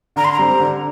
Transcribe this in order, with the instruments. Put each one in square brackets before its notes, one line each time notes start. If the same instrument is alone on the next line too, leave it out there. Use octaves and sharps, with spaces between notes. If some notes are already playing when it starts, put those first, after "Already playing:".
[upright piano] D3 [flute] A#5
[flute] C6
A#5
[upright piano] G3 C4
D3